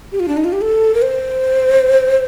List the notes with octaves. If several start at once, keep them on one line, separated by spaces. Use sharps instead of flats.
G4
F4
D4
D#4
F4
G4
A4
A#4
C5